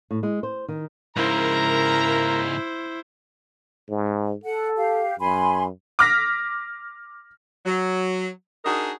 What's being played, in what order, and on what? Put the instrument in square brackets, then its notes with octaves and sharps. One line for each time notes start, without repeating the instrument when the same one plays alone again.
[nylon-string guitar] A2
G#3
C5
D#3
[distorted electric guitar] G#2 C#3 [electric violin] E4 C5 [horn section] A#4 A#5
[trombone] G#2
[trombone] A4 [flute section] F#5
[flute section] G4 F5
[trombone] F#2 [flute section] G#5 B5 C6
[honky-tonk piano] D6 F6 A#6 B6
[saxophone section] F#3
D4 D#4 F#4 G#4 A#4 D#5